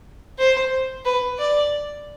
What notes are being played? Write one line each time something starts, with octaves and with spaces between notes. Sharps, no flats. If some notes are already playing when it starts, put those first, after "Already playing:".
C5
B4
D5